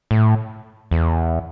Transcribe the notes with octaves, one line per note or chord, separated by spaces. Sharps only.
A2
E2